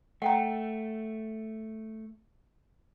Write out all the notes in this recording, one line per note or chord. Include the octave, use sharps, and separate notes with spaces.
A3 F#5 G5 A#5